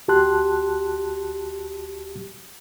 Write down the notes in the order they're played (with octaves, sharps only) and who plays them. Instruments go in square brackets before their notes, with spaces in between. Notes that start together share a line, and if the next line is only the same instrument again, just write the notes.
[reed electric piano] D2 F#4 G4 A5 C6 F#6